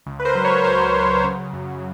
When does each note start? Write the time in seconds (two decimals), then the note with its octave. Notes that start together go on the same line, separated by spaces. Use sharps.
0.06 C#2
0.19 B4
0.25 A#4 C5
0.35 F#3
0.45 B4 C#5
0.57 C#5
0.64 C#2 A#4 C5
0.94 F#3
1.24 C#3
1.53 F#2